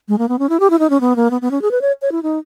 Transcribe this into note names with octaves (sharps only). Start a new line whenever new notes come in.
G#3
A#3
B3
C#4
E4
G4
E4
D#4
C#4
B3
A#3
B3
B3
C#4
G#4
B4
C#5
C#5
E4
D#4